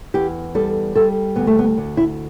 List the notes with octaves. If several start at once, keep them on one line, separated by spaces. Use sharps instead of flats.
E2 G4
G3 A4
G3 A4
D2 B3
A3
B3
D2
E4